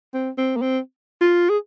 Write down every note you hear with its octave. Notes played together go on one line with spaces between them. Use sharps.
C4
C4
A#3
C4
F4
G#4